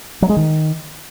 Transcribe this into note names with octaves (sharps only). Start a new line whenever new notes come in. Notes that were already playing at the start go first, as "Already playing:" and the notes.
F#3
G#3
D#3